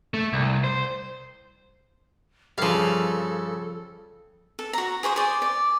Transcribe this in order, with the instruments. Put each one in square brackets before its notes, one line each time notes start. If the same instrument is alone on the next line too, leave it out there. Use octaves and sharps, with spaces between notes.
[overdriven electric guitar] A3
C2
C5
[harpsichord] G2 C#3 [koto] F3 F5 [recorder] A4
[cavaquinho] A4
F#4 A#5
G#4 C5 C#6 D#6
G#4 C5 D5
D5